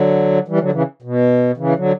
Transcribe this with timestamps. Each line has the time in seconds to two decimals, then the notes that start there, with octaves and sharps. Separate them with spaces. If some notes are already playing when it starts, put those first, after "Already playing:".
Already playing: D3 F#3
0.48 E3 G3
0.59 D3 F#3
0.71 C#3 E3
1.02 B2
1.57 C#3 E3
1.76 D3 F#3